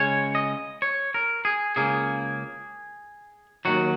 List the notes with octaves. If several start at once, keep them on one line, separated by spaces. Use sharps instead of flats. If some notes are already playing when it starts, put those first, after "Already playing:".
Already playing: C#2 C#3 G#3 C#4 C#5
D#5
C#5
A#4
G#4
C#2 C#3 A#3 G#4
D#2 D#3 F#3 F#4